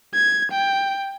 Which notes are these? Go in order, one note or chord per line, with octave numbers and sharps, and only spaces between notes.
G#6
G5